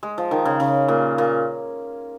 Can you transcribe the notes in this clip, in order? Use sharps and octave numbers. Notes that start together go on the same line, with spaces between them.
G#3
F3
D#3
C#3
C#3
A#2
A#2